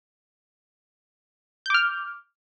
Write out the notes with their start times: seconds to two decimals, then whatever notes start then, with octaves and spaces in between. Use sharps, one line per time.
1.66 G6
1.70 D6
1.74 F6